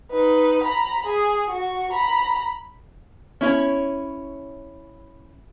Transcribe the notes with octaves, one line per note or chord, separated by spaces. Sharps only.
D#4 B4
A#5 B5
G#4
F#4 C#6
A#5 B5
C#4 E4 C#5